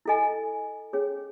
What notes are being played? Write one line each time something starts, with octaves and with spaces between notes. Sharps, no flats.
E4 A4 D#5 G#5
C#4 G#4 C#5